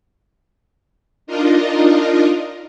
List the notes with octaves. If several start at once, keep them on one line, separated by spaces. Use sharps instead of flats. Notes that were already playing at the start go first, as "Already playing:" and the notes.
D4 D#4 F4 A#4 D#5